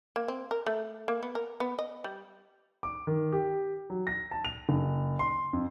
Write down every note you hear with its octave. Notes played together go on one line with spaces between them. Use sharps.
A#3
C4
A#4
A3
A#3
B3
A#4
B3
D#5
G3
D6
D#3
G4
F#3
A#6
A5
F7
F#1
C6
F2